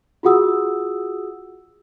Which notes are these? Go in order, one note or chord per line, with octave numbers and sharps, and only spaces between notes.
F4 F#4 G#4 F#5 D#6 E6